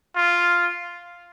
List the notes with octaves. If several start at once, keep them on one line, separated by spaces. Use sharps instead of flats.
F4